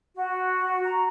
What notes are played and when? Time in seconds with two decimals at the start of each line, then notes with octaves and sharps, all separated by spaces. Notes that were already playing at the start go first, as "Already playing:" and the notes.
0.16 F#4
0.85 A#5